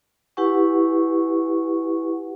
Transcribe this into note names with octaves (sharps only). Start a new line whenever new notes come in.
E4 G4 B4 F#5 G#5 C#6